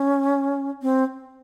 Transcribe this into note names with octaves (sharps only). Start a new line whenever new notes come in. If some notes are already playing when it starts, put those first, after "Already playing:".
Already playing: C#4
C4